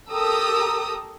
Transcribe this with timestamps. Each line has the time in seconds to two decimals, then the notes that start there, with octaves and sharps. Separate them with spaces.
0.11 G4 A4 A#4 A#5 D#6 E6